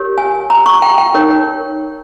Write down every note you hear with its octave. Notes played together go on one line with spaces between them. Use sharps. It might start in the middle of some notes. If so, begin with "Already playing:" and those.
Already playing: G4 A#4 C#5
G#5
A#5
C#6
G5
G5
D#4 A#4 C#5